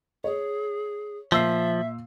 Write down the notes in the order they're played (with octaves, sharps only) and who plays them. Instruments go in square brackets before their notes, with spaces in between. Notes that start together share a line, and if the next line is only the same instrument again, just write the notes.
[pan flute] G#4 [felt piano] C#5
[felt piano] A#2 E6 C7 [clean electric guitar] F3 [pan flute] E5